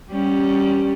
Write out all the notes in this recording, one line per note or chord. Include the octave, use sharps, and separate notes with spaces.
G3 C#4